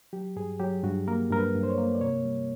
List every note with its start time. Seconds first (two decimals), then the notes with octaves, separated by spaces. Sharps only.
0.13 F#3 G4
0.36 G2 G#4
0.60 F#3 G4
0.84 G2 F#4
1.08 A#3 A#4
1.30 G2 A#4
1.39 B4
1.55 G2
1.63 C5
1.70 C#5
1.78 A#3
1.95 D5
2.01 C3 C#5
2.25 G3